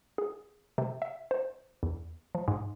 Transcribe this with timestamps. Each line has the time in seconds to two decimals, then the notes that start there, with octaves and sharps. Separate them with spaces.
0.18 G#4
0.78 C3
1.02 E5
1.31 C5
1.83 E2
2.35 F3
2.48 G#2